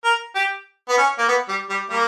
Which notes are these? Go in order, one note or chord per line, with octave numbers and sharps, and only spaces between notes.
A#4
G4
B3
C#4
A#3
B3
G3
G3
G3 A#3